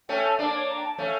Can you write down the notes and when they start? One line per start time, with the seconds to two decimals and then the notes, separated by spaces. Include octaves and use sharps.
0.09 A3 C#4 G5
0.24 A5
0.38 A#3 D4 A5
0.54 C#5
0.69 A#5
0.77 G5
0.83 A5
0.98 A3 C#4 F5